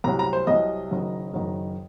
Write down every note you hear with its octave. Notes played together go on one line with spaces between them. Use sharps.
C2 C3 F#3 A#5
A#5
C5
C2 C3 F#3 D#5
F#1 F#2 D#3 F#3
F#1 F#2 D#3 F#3